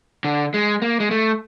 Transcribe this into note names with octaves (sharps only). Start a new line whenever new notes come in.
D3
G#3
A#3
G#3
A3